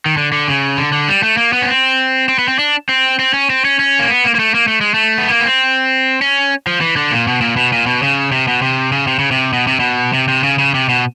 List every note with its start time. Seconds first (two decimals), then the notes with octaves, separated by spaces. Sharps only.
0.06 D#3
0.17 D3
0.32 D3
0.48 C#3
0.77 D3
0.93 D3
1.08 G3
1.23 A3
1.37 A#3
1.53 B3
1.62 C#4
1.67 C4
2.28 C4
2.39 B3
2.48 C4
2.59 D4
2.89 C4
3.19 C4
3.34 C#4
3.50 C4
3.65 C#4
3.79 C#4
3.99 A#3
4.09 B3
4.24 A#3
4.35 A#3
4.39 A3
4.54 A#3
4.68 A3
4.81 G#3
4.94 A3
5.18 B3
5.30 A#3
5.41 B3
5.45 C4
6.21 C#4
6.67 F3
6.81 E3
6.96 D3
7.11 A#2
7.27 B2
7.41 A#2
7.56 B2
7.73 A#2
7.87 B2
8.03 C#3
8.32 C3
8.48 B2
8.62 C3
8.92 C#3
9.07 C3
9.19 C#3
9.31 C3
9.53 B2
9.67 C3
9.80 B2
10.13 C3
10.28 C3
10.43 C#3
10.59 C#3
10.74 C3
10.89 B2